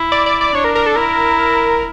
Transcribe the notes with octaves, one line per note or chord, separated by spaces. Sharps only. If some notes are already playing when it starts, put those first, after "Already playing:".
Already playing: E4
D5
D5
D5
D4 C#5
A#4
A#4
A4
E4 A#4